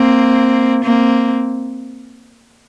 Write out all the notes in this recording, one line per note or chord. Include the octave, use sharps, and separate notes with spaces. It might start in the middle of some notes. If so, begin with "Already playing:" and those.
Already playing: A#3 C4
A#3 C4